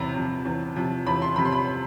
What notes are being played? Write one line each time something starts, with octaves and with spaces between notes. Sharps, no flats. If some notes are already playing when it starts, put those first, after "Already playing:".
Already playing: E2 C3 A#5 B5
C3 F3
E2
C3 F3
E2 B5
C6
C3 F3 B5
C6
B5